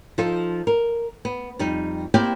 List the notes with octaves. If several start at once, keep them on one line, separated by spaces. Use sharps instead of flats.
F3 D#4 F4 A4
A#4
B3
F2 G3 D#4
A#3 C4 E4 G4 D5 G5